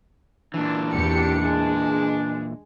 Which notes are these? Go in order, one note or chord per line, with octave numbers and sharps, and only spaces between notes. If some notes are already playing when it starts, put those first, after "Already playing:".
A#2 E3 D4
E2 G4 C#7
G#3